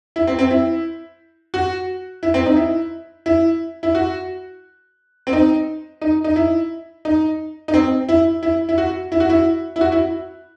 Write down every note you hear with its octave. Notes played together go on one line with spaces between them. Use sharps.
E4
C4
C4
E4
F#4
E4
C4
D#4
E4
E4
E4
F#4
C4
D#4
D#4
D#4
E4
D#4
D#4
C4
E4
E4
E4
F#4
E4
F#4
E4
E4
F#4
E4